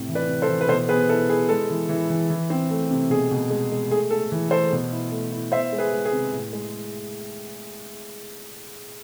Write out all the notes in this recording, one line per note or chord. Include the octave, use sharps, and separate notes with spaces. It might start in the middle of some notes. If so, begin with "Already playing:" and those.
Already playing: A2 C3
E3
B4 D5
C3
A4 C5
E3
B4
B2 A4 C5
B3 G#4 B4
E4 A4
E4 G#4
G#3 A4
E3
E3
E3
E3
C4
A3
C3
B2 G#4
B2
G#3
G#3
A3 G#4
A3 A4
E3
A3 A4 C5
B2
E4
A3
E4
B3 C5 E5
G#3
G#4 B4
G#3
G#4
C3
A2
G#3